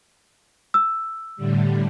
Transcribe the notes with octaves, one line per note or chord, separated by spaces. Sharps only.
E6
A2 D3 G3